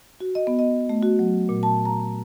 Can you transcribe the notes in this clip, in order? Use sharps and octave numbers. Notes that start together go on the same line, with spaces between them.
F#4
D#5
B3
D#5
A3
F#4
F#3
A#2
A5
A#5